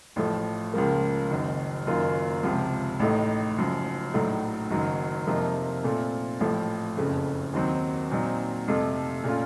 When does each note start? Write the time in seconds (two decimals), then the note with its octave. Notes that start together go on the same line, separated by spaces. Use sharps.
0.16 A1 A2 F3 A3
0.74 C#2 C#3 F3 A#3
1.31 F#1 F#2 D#3
1.86 F#1 F#2 D#3 A#3 F4
2.43 C#2 C3 F3
3.00 A1 A2 A3 D#4
3.57 F#1 F#2 F3
4.14 A#1 A2 F#3 A3 D#4
4.70 F#1 F#2 D#3 F#3
5.27 F2 C3 F3 A#3 D#4
5.84 A#2 A3 C4 F4
6.40 A1 A2 F3 A3
6.97 F#1 F2 C#3 A3
7.53 D#2 D#3 F#3 C4
8.11 A#2 F#3 C4 D#4
8.68 F2 C3 F3 A3
9.24 A#2 A3 C#4 F4